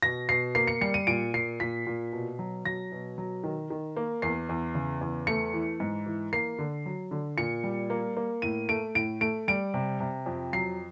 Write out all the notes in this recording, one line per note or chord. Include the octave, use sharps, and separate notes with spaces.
B2 A#6
B2 C7
A#3 C7
C#7
G3 C#7
D#7
A#2 D7
A#2 C7
A#2 B6
A#2
B2
F#3
F#3 A#6
B2
F#3
D#3
D#3
A#3
E2 C7
E2
C#3
E2
A3 C#7
E3
G#2
E3
A#3 C7
D3
F#3
D3
A#2 C#7
G3
A#3
A#3
A2 D#7
A3 D7
A2 D7
A3 D7
G3 D7
C3
C3
F2
F#3 C7